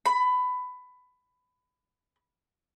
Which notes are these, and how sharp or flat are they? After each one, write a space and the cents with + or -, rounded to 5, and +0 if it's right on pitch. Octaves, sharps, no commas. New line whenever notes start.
B5 +20